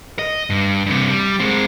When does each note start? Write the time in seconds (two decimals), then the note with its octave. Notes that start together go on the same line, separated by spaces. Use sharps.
0.19 D#5
0.50 G2
0.86 G2 C3
1.10 G3
1.40 G#3 C4